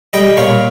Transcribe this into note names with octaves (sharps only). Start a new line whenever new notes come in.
G3 D#5 G5
A#2 C#5 F5